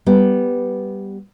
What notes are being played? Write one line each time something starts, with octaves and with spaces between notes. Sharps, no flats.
G3 B3